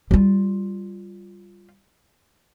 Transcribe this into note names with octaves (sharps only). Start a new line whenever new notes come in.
G3 F4